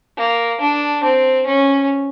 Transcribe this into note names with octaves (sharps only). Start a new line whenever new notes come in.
A#3
D4
C4
C#4